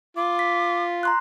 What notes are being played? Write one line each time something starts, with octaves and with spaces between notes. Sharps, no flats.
F4 D6
B6
A#5 C6 F#6